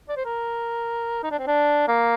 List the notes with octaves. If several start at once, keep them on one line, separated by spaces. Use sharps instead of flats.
D5
C5
A#4
D#4
D4
C4
D4
A#3